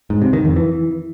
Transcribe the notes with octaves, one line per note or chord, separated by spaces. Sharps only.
G#2
C3
D#3
F2
E3